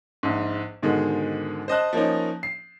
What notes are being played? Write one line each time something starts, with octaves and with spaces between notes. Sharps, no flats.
A#1 G#2
G#2 B2 D3 D#3 G#3
C5 D#5 A5 F#6
F3 A#3 C#4 D#4
C7